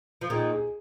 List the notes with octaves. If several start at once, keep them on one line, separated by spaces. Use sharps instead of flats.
F3
A#2 D#3 G#4
G#4